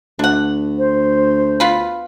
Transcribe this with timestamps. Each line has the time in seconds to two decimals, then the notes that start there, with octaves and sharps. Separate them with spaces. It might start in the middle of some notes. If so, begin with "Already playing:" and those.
0.19 D2 D4 F#5
0.78 C5
1.60 B3 F4 B5